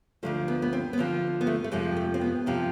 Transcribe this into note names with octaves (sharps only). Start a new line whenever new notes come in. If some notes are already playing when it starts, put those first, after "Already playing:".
D2 D3 F3 A3
B3
B3
C4
B3
D2 D3 F3 C4
B3
A3
A3
F2 C3 F3 G#3
A3
C4
B3
F2 C3 F3